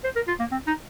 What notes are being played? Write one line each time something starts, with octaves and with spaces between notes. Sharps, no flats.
C5
A#4
F4
A#3
C4
D#4